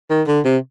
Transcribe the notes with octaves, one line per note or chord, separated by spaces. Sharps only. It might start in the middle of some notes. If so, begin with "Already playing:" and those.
D#3
D3
C3